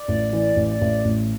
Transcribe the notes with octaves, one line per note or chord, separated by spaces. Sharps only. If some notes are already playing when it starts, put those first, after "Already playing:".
Already playing: D5
A1
E3
A1
A1
A1